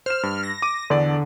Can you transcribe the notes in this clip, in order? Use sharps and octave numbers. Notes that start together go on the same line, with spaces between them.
C5 F6 E7
G2
A#6
D6 D#7
E2 D3 D5